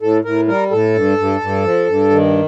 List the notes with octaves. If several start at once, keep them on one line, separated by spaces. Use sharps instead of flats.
A2 A4
A2 A#4
G3 A#4
A2 A4
G2
G2
G2
F3
G2
D#3